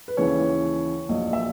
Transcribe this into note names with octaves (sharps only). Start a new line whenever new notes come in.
B4
D#2 C#3 E3 C#5
A#1 A#2 F#3 D#5
E5